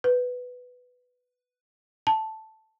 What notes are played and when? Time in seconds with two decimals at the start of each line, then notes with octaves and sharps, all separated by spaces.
0.04 B4
2.07 A5